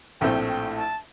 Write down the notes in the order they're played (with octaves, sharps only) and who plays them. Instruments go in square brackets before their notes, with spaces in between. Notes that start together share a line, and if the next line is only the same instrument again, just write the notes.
[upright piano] A#1 A2 A3 C4 [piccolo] G5
[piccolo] G5
A5